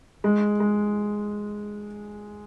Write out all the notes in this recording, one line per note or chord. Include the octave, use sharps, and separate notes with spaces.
G#3
G#3